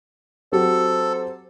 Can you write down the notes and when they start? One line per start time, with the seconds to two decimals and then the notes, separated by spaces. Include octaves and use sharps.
0.52 F#3 C4 G4 A4 C5